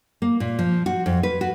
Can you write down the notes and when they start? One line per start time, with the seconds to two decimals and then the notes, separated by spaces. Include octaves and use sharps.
0.22 A#3
0.40 A#2
0.59 F3
0.86 F#4
1.06 F2
1.23 B4
1.41 F#4